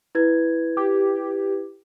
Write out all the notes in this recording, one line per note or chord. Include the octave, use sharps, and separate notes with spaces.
E4 B4 G#6
G4